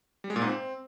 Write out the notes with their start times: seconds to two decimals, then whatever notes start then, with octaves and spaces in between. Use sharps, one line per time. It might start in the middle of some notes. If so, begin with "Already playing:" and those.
0.24 G3
0.30 G#3
0.36 A#2
0.42 G#2
0.48 C4